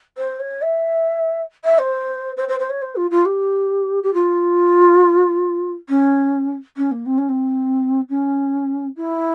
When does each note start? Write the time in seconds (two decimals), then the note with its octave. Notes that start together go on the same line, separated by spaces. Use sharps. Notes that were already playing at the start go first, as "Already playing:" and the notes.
0.17 C5
0.39 C#5
0.61 E5
1.64 E5
1.78 C5
2.36 C5
2.48 C5
2.59 C5
2.69 C#5
2.81 C5
2.96 F4
3.10 F4
3.25 G4
4.03 G4
4.13 F4
5.89 C#4
6.77 C#4
6.91 A#3
7.05 C4
7.17 C#4
7.28 C4
8.09 C#4
8.96 E4